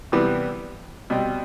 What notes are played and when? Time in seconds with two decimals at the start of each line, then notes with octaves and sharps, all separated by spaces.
0.12 C3 E3 G3 B3
1.10 B2 G3 C4